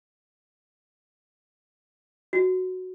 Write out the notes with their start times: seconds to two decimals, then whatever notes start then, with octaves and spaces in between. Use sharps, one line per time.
2.33 F#4